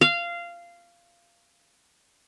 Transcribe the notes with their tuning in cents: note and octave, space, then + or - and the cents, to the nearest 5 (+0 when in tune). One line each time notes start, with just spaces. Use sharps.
F5 -15